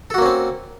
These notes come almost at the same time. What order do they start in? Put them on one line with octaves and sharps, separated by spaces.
A4 F#4 A#3 C#4 C4